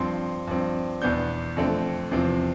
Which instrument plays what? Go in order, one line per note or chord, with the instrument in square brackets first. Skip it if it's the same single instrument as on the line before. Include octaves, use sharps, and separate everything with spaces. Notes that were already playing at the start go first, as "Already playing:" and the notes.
Already playing: [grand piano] G2 F3 C4 C6
G2 F3 C4
E2 B2 B3 D4 G6
F2 D3 A3 C4
E2 C3 F3 C4